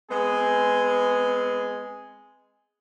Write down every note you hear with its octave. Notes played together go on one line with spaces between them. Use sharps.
G#3 B3 C4 G#4